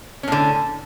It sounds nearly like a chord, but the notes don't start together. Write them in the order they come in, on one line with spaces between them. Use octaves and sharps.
C#4 A2 D3